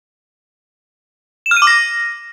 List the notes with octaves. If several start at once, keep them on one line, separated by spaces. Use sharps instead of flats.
E7
F6
D#7
D6
A#6